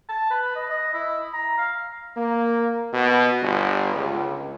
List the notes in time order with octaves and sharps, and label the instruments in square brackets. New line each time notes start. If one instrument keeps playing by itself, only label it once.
[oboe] A5
B4
D#5
D#5
E4
A#5
F5
[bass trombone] A#3
B2
G1
C#2